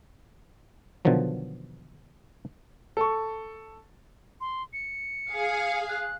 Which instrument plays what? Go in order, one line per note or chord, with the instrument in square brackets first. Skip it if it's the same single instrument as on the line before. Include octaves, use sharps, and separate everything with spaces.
[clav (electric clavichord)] B2 D3 D#3 F3 F#3
[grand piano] A4 C#6
[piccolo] C6
C#7
[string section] G#4 F5
[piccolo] F#6